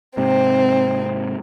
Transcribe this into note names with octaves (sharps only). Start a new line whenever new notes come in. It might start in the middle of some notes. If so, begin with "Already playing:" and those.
G#2 C3 C4